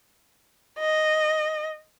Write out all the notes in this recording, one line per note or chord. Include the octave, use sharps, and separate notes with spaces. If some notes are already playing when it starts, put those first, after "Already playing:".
D#5